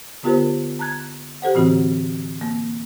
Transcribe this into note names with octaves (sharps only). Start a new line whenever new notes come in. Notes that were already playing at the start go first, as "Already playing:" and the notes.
D3 B3 F4 G4 A#4 C5
A5 A#5 F#6 G#6
G4 A4 C5 F#5
A2 D3 E3 C4 F#4
A#3